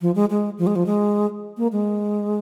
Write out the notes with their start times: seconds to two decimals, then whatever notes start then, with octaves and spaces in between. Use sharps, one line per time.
0.02 F3
0.15 G#3
0.30 G#3
0.58 F3
0.67 G#3
0.76 F3
0.86 G#3
1.58 A#3
1.72 G#3